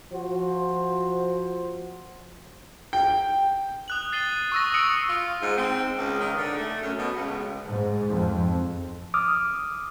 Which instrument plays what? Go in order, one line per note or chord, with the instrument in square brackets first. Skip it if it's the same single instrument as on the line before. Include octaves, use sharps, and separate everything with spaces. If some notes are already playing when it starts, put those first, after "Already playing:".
[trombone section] F3 F#4 C5
[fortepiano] G5
[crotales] D#6 F#6 F#7
A6 C7 D#7 G7
C#6 E6 A#6
D#6 A#6 C#7 D7 F#7
[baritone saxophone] F4
G#2
C4
C#2
D#3
D3
A3
F#2
B2
C#2
[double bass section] G#2
F2
[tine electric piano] D6 D#6 F6